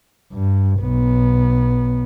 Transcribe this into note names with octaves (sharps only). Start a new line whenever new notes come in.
G2
B1 B3